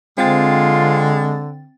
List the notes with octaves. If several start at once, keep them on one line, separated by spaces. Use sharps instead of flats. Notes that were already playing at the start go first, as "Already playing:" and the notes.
D3 G#3 C4 F4 G5 A6